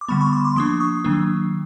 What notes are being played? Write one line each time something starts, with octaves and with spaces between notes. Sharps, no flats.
D6
D3 G3 B3 B5 C#6
B5 C#6
C6 D6
C6 D6
F3 A#3 D4 C#6 D#6
C#6 D#6
D#3 F#3 A#3 D4